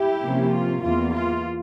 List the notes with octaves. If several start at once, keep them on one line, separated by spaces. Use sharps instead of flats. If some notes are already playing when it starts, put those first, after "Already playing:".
Already playing: E4 G4
C3 F3 A#3 C#4
F4
E2 E3 A#3 F4
F4